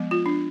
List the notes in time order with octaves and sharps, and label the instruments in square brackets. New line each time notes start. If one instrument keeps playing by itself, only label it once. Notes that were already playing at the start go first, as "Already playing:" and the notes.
Already playing: [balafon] F3 G#3 B3
F4
D4